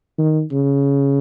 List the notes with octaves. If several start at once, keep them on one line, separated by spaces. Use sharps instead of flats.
D#3
C#3